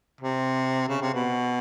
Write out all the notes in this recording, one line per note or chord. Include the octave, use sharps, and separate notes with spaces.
C3
C#3
C3
B2